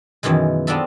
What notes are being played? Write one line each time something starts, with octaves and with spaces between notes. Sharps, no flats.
F#2 B2 D#3 E3 G#3
B3 C4 D4 F4 A4 E5